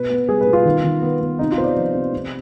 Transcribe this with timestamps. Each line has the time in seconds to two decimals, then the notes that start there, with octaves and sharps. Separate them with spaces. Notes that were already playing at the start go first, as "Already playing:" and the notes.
Already playing: B2 B4
0.10 B3
0.28 G3 G#4
0.41 B4
0.47 B2
0.53 F4
0.65 D#3
0.84 D#3
1.02 B3
1.21 B3
1.39 C3 D#4
1.52 F4
1.58 B3 C5
1.63 D5
1.76 F3
1.95 C3
2.13 C3